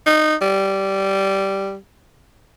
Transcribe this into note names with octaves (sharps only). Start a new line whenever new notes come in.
D#4
G3